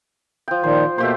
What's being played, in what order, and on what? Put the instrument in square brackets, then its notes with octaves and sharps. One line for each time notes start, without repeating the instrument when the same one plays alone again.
[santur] F3 G5
[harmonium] A#2 D#3 F3 [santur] C5
[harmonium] B2 A#3 [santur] A3 G4 C5